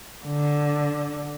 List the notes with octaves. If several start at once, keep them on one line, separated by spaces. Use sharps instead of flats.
D3